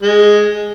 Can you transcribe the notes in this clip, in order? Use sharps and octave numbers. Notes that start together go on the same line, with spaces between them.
G#3